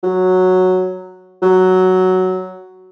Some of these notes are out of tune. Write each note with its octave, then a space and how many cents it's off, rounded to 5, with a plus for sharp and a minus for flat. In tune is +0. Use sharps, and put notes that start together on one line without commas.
F#3 -5
F#3 +5